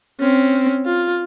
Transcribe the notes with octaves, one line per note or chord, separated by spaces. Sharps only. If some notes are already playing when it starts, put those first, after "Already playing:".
C4 C#4
F4